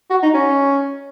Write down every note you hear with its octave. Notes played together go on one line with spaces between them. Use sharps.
F#4
D#4
C#4